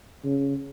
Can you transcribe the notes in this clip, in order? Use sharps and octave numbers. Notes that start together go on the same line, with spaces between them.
C#3